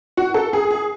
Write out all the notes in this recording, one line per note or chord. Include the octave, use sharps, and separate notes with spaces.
F#4
A4
G#4
G#4